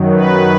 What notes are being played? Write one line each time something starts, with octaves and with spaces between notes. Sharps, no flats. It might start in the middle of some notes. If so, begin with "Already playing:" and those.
Already playing: F#2 D#3 F#3
B4